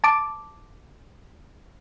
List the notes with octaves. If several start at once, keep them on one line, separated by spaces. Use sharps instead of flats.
A5 D6